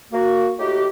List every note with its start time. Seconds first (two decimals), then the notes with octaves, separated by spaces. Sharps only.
0.12 A#3 F#4
0.58 A2 D#4 F#4 G4